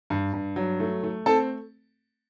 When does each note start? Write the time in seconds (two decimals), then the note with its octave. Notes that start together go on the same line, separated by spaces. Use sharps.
0.10 G2
0.33 G2
0.56 F#3
0.80 A3
1.03 A3
1.26 C4 A4 A5